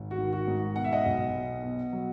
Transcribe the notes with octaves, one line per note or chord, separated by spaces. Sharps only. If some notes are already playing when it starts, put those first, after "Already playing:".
Already playing: G#1
F#4
D#3
F#4
G#2
B2 F#5
E5
D#5 F#5
B1
B2
B2
F#3